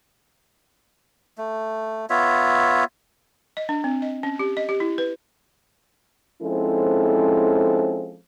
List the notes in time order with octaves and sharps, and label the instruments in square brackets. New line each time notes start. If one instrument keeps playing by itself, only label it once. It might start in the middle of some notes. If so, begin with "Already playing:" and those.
[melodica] A3
B3 F4 C#5 E5
[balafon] D#5
D4
C4
D#5
C#4
G4
D#5
G4
E4
B4
[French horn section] F3 G#3 C4 C#4 E4 A4